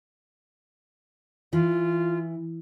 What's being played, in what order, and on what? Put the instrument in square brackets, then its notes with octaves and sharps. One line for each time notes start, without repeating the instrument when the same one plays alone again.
[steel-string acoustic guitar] E3 [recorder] F4